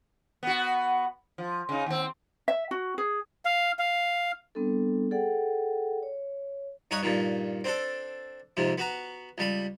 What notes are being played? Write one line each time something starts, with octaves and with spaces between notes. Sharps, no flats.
B3 F#4
F3
C#3 D#4
D#2 C4
E5
F#4
G#4
F5
F5
G3 B3 C4 D4 A4
G#4 A4 D5 F#5 G5
C#5
G2 D#4 C#5 F#5 D#6
G2 A#2 D#3
C4 D4 A4
F2 G#2 C3
B3 F#4 A#5
C#2 G3 B5